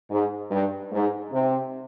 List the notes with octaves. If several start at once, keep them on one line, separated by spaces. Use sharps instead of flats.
G#2
G2
G#2
C3